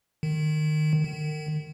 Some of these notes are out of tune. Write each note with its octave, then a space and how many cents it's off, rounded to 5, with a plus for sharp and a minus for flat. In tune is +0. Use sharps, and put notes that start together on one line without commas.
D#3 -25
D#3 -35